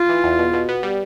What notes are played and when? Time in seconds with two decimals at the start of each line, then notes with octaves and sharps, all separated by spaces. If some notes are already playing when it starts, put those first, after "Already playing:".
Already playing: F4
0.09 E3
0.24 E2
0.39 B2
0.53 B2
0.69 B3
0.83 G3